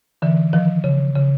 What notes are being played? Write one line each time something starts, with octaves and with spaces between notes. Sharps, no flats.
D3 E3
D#3 F3
C#3
C#3